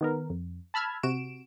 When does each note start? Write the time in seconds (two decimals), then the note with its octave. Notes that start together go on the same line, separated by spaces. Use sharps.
0.01 D#3 B3 A#4
0.30 F2
0.74 A5 B5 E6 F6 G#6
1.03 C3 F#4 D7 E7